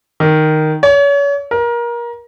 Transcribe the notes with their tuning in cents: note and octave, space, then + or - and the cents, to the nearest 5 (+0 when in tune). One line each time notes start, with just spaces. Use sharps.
D#3 -5
C#5 +35
A#4 +25